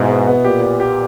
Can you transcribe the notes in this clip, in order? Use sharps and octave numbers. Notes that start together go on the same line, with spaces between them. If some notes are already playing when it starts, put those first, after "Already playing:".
Already playing: G#2 B2 E4
B3
B3
A#2 G4
G4
G4